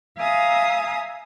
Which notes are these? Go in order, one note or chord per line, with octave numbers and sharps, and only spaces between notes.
E5 F5 G#5 A#5 D#6